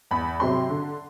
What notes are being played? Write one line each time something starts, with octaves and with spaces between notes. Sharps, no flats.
E2 B5
C3 F#3 C4 C6
D3